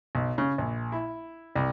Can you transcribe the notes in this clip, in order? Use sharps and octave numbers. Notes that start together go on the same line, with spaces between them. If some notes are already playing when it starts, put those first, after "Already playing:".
B1
C#3
A#1
E4
C2